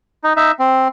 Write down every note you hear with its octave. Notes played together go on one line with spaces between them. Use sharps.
D#4
D#4 E5
C4